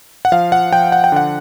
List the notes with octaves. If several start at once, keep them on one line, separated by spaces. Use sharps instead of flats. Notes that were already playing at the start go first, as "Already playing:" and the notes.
F#5
F3 F5
F#5
F3 G5
F#5
G5
D3 F#5